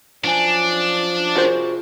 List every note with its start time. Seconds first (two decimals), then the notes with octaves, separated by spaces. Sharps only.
0.24 F#2 F3 D4 G#5
1.36 C3 F4 F#4 G#4 A#4 C5